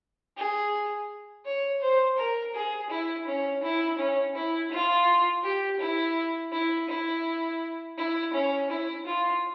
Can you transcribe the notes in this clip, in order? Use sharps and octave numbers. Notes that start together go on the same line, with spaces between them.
G#4
C#5
C5
A#4
G#4
E4
C#4
E4
C#4
E4
F4
G4
E4
E4
E4
E4
C#4
E4
F4